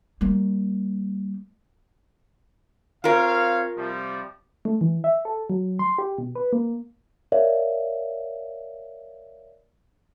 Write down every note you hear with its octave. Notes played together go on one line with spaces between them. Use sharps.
G3 A#3
C4 F4 A#4 C#5 F5
C3 F3 G3
A3
E3
E5
A4
F#3
C6
G4
B2
B4
A#3
A#4 C#5 D5 E5 F5